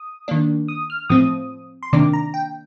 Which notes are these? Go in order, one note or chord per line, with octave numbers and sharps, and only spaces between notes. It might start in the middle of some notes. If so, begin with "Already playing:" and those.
Already playing: D#6
D#3 A#3 D4
D#6
F6
A2 F3 C4 D#6
C6
C3 D#3 A#3 D4 D6
A#5
G5